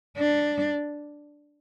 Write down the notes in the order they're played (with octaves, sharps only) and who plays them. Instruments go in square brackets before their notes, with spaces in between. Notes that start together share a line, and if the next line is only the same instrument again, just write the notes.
[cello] D4